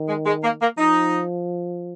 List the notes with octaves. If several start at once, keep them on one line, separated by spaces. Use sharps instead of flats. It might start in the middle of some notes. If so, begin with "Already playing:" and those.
Already playing: D#3
G#3
G#3
A#3
A#3
F3 D#4